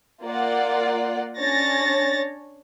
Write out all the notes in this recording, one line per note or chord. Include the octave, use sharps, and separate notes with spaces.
A#3 F4 D5 F#5
C#4 D4 C#5 A6 A#6